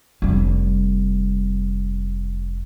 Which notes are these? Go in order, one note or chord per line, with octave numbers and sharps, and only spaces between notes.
F1 G3